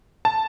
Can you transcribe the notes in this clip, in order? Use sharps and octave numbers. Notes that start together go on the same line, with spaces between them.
A5